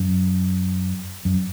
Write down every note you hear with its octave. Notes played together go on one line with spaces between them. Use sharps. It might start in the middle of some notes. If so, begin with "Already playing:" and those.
Already playing: F#2
F#2